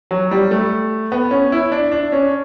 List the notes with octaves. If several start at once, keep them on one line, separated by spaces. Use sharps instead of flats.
F#3
G3
A3
B3
C#4
E4
D4
D4
C#4